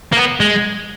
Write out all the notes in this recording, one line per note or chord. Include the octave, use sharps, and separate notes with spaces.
A#3
B3
G#3